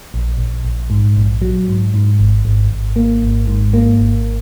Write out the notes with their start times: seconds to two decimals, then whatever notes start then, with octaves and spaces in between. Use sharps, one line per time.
0.14 A#1
0.38 A#1
0.65 A#1
0.90 G#2
1.17 A#1
1.41 F#3
1.68 G#2
1.94 G#2
2.19 G#1
2.45 G#1
2.71 G#1
2.96 A#3
3.23 G#1
3.47 G#2
3.73 A#3
4.00 G#1